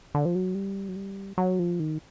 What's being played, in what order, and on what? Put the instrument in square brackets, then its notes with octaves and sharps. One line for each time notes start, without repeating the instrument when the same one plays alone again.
[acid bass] D3
F3
F#3
G3
F#3
G3
F#3
F3
D#3